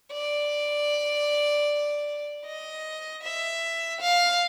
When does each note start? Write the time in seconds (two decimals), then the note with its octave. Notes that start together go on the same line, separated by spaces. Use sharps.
0.14 D5
2.46 D#5
3.23 E5
4.01 F5